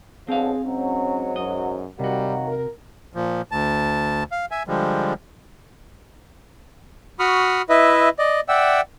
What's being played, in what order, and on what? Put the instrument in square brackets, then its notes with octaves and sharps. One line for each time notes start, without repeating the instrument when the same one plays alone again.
[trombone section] B1 D3 F3 [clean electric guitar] C4 F5 [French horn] G#4
[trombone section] G#2 F#3 [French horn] C#4
[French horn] F#2 [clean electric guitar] D#5
[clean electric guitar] C3 F#4 [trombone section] D#3 F#3 A#3 [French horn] G3
[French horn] A#4
[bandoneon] A#2 F3
D2 A5
F5
E5 G#5
D3 F3 G3 G#3
[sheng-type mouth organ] F#4 B5 C#6 D#6 F6
E4 B4 D#5 E5
D5 D#5
D5 E5 F#5 G5 E6